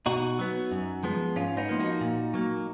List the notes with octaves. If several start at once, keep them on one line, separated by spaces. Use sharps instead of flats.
B2 D#4 F#4
F#3 B3
F#2
F3 G#3 B3
G#2 C#4 F4
B3 D#4
F3 A#3
D#4 F#4
A#2
F#3 A#3